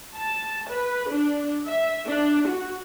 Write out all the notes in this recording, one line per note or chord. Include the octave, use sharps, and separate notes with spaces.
A5
B4
D4
E5
D4
F#4